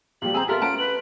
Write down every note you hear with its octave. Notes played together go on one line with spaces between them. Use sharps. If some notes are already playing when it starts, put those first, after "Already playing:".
A#1 G3 F4 G4 F#7
C4 G#4 G#5 A#5 E6
F4 G4 A4 A#4 E5 F6
C#4 F#5 A5 A#5 D7
B4 F#7